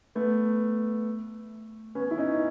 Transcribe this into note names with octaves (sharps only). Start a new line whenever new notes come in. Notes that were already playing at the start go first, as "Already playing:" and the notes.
A3 B3
B3 C#4
E4
C#4 D#4